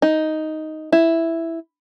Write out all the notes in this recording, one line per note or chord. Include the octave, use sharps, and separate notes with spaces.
D#4
E4